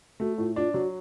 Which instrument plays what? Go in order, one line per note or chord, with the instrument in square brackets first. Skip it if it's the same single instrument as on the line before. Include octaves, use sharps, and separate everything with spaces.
[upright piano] A3 [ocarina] F#4
[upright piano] A2 [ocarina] F4
[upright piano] D4 [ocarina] F4
[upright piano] F#3 [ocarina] F#4